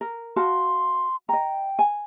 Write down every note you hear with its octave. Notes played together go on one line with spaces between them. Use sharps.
A#4
F#4 F5 A5 C6
D#5 G5 A#5
G#5